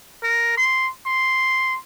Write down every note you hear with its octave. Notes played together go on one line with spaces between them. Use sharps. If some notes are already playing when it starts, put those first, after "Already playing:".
A#4
C6
C6